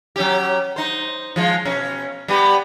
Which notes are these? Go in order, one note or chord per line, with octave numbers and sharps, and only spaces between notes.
F#3 C#4 G4
D#4 C5
F3 G#3 F4
B2 C#4
G3 B3 G4